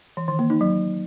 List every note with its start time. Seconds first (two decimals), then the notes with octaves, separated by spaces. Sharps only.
0.17 E3
0.28 D#3
0.39 A#3
0.50 D#4
0.61 F#3